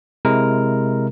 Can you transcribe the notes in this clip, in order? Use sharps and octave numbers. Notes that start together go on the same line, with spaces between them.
C3 G#3 E4 A#4